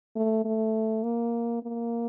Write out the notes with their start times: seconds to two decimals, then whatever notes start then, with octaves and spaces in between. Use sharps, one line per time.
0.16 A3
0.45 A3
1.04 A#3
1.63 A#3